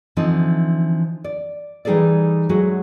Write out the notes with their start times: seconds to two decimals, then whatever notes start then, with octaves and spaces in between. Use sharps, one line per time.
0.17 D3 E3 F3 C4 D#4
1.24 D5
1.85 E3 G3 D#4 G#4 A4 D5
2.49 F#3 G#3 A3 F#4 G#4